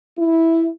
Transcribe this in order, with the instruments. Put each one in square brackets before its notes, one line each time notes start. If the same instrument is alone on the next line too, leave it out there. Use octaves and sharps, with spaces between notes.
[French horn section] E4